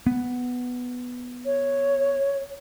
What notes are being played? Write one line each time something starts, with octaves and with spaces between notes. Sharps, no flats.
B3
C#5